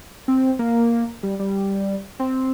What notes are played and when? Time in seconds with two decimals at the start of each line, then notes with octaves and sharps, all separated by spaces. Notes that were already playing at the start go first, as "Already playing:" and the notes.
0.28 C4
0.59 A#3
1.23 G3
1.39 G3
2.19 C4